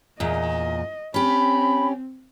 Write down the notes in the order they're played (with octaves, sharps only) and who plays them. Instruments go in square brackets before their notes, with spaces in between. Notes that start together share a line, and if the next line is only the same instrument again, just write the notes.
[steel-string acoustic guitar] E2 A#2 [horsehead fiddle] D#5
[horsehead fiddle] C4 [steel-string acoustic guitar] C#4 G4 [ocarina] B5